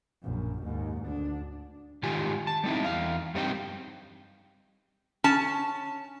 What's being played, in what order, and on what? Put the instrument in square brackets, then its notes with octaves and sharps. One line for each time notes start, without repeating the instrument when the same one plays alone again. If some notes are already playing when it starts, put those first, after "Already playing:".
[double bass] A#1 F#2
D#2 G#2
D2 D4
[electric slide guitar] G#2 D#3 F4 G4 G#5
A5
G3 A3 C4 D#4 E4
E2 F5
G2 G3 C4 D4 D#4 G5
[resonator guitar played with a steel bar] C#4 A5